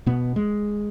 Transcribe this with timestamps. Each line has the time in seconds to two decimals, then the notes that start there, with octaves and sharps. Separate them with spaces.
0.06 B2 B3
0.36 G#3